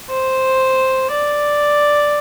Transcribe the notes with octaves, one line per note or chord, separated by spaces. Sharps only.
C5
D5